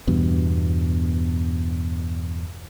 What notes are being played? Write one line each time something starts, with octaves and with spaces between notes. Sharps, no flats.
E2 G2 B2